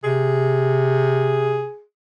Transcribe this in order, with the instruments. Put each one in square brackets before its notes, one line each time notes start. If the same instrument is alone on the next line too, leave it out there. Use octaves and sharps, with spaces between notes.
[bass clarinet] C3 [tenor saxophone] G#4